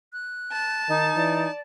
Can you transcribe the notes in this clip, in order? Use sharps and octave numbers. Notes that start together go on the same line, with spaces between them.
F#6
A5
D#3 D#4
E3 D5